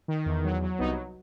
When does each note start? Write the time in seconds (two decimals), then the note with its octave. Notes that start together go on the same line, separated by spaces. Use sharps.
0.08 D#3
0.26 E2
0.44 F#3
0.62 F#3
0.79 C2 B3 D#4